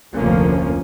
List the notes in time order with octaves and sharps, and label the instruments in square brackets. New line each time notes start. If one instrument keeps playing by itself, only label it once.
[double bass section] F1 D2 F3 A#3 C#4